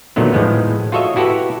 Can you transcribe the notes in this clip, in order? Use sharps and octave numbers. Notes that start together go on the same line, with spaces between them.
A#2 D3 D#3 F#3 A3 B3
A2 F3 G#3 B3
F4 F#4 A4 C#5 D#5 E5
E4 F#4 G4 A4 B4